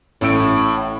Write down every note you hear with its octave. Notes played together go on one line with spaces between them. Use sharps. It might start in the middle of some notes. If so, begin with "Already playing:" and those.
A1 A2 E6 D7